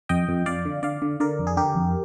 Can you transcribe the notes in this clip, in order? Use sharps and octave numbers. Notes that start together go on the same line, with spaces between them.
F2 D#5 G5
F2
F2 D5 F5
D3
D3 D5 F5
D3
D3 A#4 D5
F2
G#4
D3 G4 A#4
F2